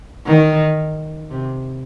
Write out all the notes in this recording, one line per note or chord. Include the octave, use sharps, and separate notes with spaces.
D#3
C3